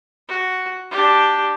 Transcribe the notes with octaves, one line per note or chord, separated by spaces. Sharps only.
F#4
D4 G4